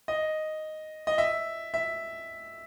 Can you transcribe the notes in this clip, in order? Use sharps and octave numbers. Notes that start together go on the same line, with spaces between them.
D#5
D#5
E5
E5